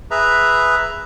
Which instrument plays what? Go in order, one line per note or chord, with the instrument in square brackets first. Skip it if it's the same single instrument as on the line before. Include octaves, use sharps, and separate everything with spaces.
[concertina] G#4 B4 E5 A#5